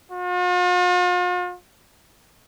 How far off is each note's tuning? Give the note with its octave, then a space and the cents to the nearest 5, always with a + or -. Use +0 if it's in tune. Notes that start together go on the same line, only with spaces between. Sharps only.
F4 +45